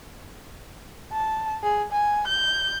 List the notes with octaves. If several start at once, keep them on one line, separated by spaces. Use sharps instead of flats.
A5
G#4
G#5
G6